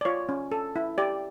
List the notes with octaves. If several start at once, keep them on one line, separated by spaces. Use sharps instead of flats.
D5
F4 C#5
C#4
A4
E4
G4 D5